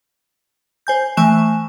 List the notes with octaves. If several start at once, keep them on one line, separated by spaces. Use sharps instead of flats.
C5 G#5 G6
E3 A3 G#5 C#6 F#6 E7